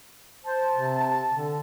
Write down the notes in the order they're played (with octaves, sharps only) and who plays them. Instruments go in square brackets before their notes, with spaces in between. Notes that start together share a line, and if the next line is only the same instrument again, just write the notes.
[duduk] C5 [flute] A5
[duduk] C3
D3